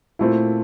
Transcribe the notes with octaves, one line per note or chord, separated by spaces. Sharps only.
A#2 A3 C4 E4